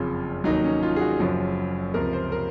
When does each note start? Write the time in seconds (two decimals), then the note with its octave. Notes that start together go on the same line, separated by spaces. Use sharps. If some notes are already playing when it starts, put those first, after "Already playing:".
Already playing: F#1 F2 C#3 F4
0.44 F1 D#2 D#3 F#3 D#4
0.64 C#4
0.83 F4
0.96 G#4
1.00 F#4
1.20 F#1 F#2 F3
1.94 C#2 C3 F3 A#4
2.13 C5
2.32 A#4